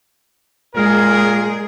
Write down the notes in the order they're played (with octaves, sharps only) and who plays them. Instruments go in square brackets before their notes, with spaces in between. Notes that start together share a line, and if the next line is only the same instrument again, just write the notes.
[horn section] A#2 A#4 [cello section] G#3 G#4